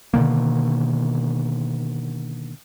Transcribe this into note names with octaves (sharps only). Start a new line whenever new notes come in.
B2 D3 D#3 A#3